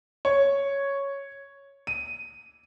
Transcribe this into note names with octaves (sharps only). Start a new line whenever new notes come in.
C#5
D#7